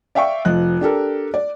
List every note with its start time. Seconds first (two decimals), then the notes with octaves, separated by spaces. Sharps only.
0.15 D5 E5 F5 G5 C#6
0.45 F1 F3 D#5 F#6
0.81 D4 G4 A4 A#4
1.34 D5